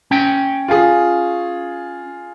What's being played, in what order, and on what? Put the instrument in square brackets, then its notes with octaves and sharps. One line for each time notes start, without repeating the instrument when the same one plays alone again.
[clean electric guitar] C#4 G5
[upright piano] F4 G#4